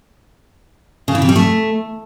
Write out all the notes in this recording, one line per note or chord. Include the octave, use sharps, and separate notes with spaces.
C#3
E3
C3
G3
A3